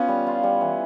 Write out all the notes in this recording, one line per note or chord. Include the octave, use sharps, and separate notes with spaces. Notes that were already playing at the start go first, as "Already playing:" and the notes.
Already playing: B3 C#4 F4
G3
F4
G3
E3